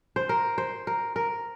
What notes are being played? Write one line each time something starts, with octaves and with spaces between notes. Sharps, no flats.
C5
A#4
C5
A#4
A#4